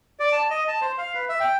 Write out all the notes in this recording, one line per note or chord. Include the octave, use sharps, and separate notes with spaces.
D5
A5
D#5
A5
C5
F5
B4
E5
G5